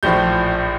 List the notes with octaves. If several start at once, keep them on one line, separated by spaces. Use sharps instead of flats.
A#1 A2 F3 G6